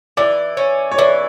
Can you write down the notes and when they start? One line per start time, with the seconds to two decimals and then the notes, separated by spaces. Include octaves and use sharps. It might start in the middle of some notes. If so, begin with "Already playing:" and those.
0.17 E3 D5
0.57 C#4
0.91 C#5
0.98 E3 D5